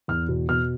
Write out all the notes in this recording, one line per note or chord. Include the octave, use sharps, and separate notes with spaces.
E2 F6
B2
B2 F6